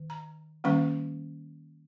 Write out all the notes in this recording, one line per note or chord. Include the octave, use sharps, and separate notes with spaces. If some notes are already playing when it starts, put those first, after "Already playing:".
Already playing: D#3
A#5
D#3 G3 A#3 C#4 C#6